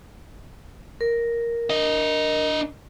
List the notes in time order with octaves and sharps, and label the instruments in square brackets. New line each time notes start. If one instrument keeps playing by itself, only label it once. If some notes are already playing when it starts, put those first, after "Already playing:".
[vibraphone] A#4
[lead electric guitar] D4 D#5